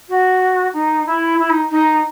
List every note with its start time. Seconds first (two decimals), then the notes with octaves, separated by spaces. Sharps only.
0.08 F#4
0.73 D#4
1.06 E4
1.38 E4
1.49 D#4
1.70 D#4